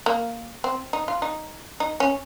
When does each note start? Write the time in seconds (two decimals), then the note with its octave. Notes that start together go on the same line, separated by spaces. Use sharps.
0.06 A#3
0.64 C4
0.93 D#4
1.08 F4
1.22 D#4
1.80 D#4
2.00 C#4